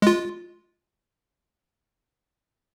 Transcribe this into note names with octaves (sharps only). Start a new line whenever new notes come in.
G#3 F4